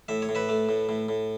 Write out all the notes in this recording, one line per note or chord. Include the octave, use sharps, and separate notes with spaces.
A2 E5
C#5
A2
B4 E5
A3
A2
A2
A2